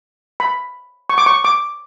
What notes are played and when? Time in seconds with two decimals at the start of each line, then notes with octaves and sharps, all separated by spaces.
0.40 B5
1.09 C#6
1.18 D6
1.26 C#6
1.44 D6